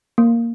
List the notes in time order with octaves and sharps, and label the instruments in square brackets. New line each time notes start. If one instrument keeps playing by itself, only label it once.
[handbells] A#3